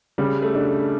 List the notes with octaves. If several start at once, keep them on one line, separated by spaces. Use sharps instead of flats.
C#3 G3
A3
D4